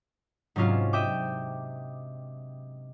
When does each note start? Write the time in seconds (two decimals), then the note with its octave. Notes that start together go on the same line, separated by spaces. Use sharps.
0.56 G#2 C3 F#3 C#4 D4 F4
0.93 D#5 E5 G5 D6